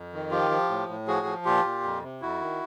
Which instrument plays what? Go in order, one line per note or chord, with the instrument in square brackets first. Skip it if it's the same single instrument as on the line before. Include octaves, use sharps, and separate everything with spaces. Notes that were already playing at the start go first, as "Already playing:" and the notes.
Already playing: [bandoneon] F2
D#3
F3 F4 G4
F3
A2
A2
F3 F#4 G#4
F3
A#2 F4 G4
A#2
F2
C3
F2 E4 F#4
D#3